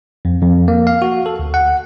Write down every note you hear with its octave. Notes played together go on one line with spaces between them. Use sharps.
F2
F2
A#3
F5
F#4
A4
D2
F#5